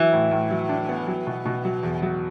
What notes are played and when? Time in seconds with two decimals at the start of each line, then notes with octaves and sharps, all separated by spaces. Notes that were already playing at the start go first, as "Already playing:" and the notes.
Already playing: E3 F#3
0.13 A2
0.31 A2
0.51 F#3
0.69 D4
0.89 B3
1.08 F#3
1.27 B2
1.45 B2
1.65 F#3
1.83 E2
2.02 F#3